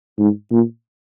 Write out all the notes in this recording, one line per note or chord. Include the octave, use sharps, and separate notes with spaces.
G#2
A#2